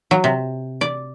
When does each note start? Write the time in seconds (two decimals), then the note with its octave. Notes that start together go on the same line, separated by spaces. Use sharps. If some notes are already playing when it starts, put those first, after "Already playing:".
0.11 F#3
0.24 C3
0.81 D5